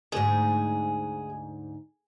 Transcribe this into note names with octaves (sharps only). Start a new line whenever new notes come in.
D2 G#2 G#4